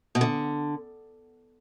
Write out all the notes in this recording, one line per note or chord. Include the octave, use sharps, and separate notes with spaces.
B2
D3